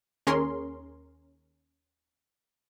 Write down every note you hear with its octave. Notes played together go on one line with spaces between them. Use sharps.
D#2 C#4 G#4 A#4 C#5 C6